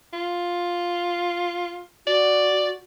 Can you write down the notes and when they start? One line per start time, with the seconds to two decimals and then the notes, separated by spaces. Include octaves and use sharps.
0.13 F4
2.07 F#4 D5